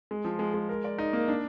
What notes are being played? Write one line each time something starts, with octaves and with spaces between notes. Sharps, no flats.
G#3
F3
G#3
G#3
A#4
D5
D#4
A#3
D4